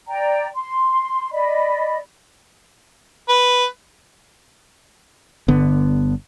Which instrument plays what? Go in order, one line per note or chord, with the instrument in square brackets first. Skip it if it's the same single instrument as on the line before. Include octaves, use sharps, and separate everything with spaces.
[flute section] D5 G5 A#5
C6
D5 D#5 B5
[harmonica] B4
[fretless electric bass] G1 D3 B3